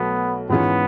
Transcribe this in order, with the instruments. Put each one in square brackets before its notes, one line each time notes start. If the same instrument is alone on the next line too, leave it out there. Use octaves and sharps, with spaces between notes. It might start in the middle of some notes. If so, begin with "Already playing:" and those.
Already playing: [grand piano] B1 B2 F#3 A3 [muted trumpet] B3
[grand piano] G#2 E3 G#3 C#4 F4 [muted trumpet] B3